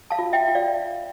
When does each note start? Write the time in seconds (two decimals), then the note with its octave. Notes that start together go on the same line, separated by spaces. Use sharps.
0.10 F5 A5
0.19 F4
0.33 E5 G5
0.48 F4
0.55 D5 F5